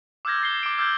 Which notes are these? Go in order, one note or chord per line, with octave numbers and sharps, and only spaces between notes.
D6 E6 F6 G6 G#6 A#6
A6 C7 G7
D6 D7
D6 E6 F6 G6 G#6